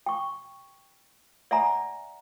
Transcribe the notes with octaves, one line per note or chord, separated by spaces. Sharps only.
G5 C#6
D5 E5 F#5 G#5 A#5